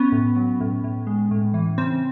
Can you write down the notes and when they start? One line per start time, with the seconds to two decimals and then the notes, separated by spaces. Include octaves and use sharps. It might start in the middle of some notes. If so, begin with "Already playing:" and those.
Already playing: B3 C#4
0.12 A2
0.36 F#3
0.61 A2
0.84 A2
1.07 G#3
1.31 A2
1.54 E3
1.78 C#3 C4